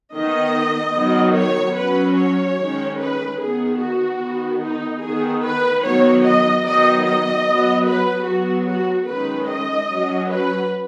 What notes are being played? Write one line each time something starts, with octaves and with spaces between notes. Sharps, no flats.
D#3 B3 D#5
D#3 F#3 B3
C#5
F#3 C#4 B4
C#5
D#3 G#3 C#4
B4
D#3 B3 G#4
F#4
D#3 B3
D#4
D#3 B3 G#4
B4
D#3 F#3 B3 C#5
D#5
D#3 F#3 B3 D#5
D#5
F#3 B3
B4
F#3 B3 F#4
F#4
D#3 G#3 C#4 B4
D#5
F#3 C#4
B4